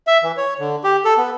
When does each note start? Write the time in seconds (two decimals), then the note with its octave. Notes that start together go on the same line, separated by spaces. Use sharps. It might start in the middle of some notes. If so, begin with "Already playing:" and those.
0.07 E5
0.23 E3
0.37 C#5
0.59 D3
0.84 G4
1.05 A4
1.17 B3